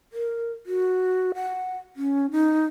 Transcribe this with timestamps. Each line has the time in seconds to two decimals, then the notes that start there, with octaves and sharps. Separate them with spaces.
0.13 A#4
0.66 F#4
1.35 F#5
1.96 C#4
2.31 D#4